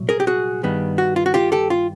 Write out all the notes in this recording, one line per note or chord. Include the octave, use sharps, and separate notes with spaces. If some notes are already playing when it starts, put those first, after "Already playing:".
Already playing: C2 A#2 F#3
G#4 A#4
G4
F#4 G#4
G2 D#3 G3 B3
F#4
F4
F#4
F4 G4
G4 A4
F4